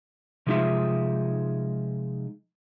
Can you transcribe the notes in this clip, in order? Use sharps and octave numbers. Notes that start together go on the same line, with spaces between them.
C3 F3 G#3 D#4 F4 E5